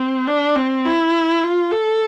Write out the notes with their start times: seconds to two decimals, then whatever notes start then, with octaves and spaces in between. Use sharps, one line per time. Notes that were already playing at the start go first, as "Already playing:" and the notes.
Already playing: C4
0.27 D4
0.55 C4
0.85 E4
1.43 F4
1.71 A4